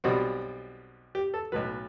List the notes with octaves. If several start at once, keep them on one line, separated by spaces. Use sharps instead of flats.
B1 B2 G3 C4 F#4
G4
A4
B1 A2 F#3 B4